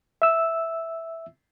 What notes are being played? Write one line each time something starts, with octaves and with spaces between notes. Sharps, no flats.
E5 E6